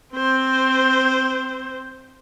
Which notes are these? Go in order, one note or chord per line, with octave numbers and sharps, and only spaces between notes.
C4 C5